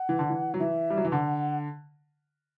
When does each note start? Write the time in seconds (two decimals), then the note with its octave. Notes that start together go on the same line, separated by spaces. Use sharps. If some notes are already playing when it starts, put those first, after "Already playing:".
Already playing: F#5
0.09 E3
0.19 D3
0.30 E3
0.54 F#3
0.59 E3 E5
0.90 G3
0.97 F#3
1.05 E3
1.12 D3 F#5